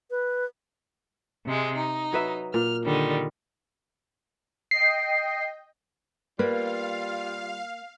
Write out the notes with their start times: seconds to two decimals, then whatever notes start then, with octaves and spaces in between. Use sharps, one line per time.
0.10 B4
1.45 C3 G#3
1.78 D#4
2.13 F#3 B4 E5
2.54 A#2 F6
2.85 D3 D#3 G3
4.71 D#5 G5 C7
6.39 G3 A#3 F4 B4 F5